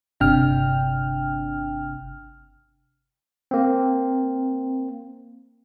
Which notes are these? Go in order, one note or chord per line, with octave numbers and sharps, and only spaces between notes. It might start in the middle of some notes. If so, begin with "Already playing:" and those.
G1 C3 D4 G5 F6
A#3 C4